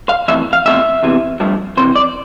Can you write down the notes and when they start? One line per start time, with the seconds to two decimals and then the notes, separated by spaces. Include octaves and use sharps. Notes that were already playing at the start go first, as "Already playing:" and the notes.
0.09 F5
0.28 F2 E3 A3 E5
0.53 F5
0.66 E2 C3 F3 A3 E5
1.03 E2 C3 E3
1.40 G2 F3 A3
1.77 F2 C3 E3 C5
1.96 D5